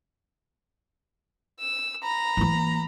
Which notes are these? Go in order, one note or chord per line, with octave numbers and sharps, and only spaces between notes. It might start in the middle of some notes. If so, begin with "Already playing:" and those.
E6
A#5 B5
E3 A#3